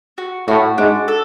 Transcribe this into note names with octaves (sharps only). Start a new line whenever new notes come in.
F#4
A2 F#4
G#2 D4
A4